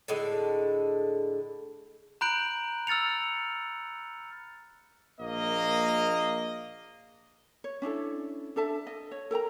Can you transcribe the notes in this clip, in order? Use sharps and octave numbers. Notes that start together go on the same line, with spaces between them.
A2 D3 G#3
A#5 B5 F#6 G6 D7 F#7
E6 F6 A6 C#7 F7
A#1 A#3 D#5
C#5
C#4 D4 E4 A4
D4 A4 E5 A5
D#5
C#5
A4 A#4 G5 A#5